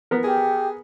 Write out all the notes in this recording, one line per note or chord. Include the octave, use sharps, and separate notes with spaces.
B3 A#4
G4 G#4